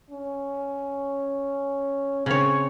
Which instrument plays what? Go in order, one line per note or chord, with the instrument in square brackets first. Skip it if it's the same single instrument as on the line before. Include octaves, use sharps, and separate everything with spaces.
[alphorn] C#4
[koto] C#3 C#5 [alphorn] C4